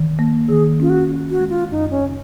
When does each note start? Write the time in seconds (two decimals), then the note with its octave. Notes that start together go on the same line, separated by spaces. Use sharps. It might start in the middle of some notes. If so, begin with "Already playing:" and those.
Already playing: D#3
0.19 A#3
0.48 D#3 G#4
0.80 C#4 F4
0.90 F#4
1.09 C#4
1.30 F#4
1.40 G#3
1.50 F4
1.70 F#2 D#4
1.91 C#4
2.02 C#3